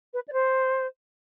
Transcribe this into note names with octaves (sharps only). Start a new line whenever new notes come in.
B4
D5
C5